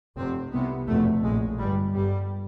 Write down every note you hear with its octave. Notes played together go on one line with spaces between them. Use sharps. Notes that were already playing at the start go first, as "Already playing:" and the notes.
F1 F2 C3 C4
C2 C3 B3
F1 E2 B2 A3
A#1 A2 G#3
G1 G2 G3
G1 G2 G3